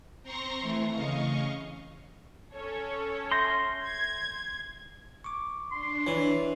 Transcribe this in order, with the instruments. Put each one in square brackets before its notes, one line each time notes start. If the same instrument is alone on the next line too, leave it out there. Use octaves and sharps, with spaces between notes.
[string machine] C4 A#5 C6 C#6 A#6
E3 A3
C#3 D#5 F5 C#6
[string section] C#4 A4 C#5
[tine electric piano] E5 G6 A#6 [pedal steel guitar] C6
[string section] G#6
[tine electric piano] C#6 D6
[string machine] D4 [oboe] C6
[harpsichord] E3 [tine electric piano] C#5